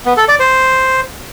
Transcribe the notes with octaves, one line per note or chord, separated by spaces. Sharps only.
B3
A4
D5
C5